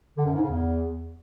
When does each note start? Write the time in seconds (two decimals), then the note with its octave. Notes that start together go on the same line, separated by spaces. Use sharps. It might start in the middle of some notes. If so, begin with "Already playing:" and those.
0.18 D3
0.26 F#2
0.34 G#2
0.42 C#3
0.50 E2